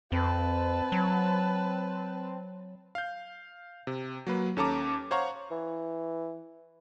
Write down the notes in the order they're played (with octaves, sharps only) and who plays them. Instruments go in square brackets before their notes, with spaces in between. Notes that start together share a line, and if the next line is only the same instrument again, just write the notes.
[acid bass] F2 [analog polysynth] C4 [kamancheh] B4 A5
[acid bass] F#3
[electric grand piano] F5 G6
C3
F#3 A#3 B4
D#2 C#4 A4 A5 A#5 D6
C5 C#5 F5 F#5 A#5 C#6
[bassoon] E3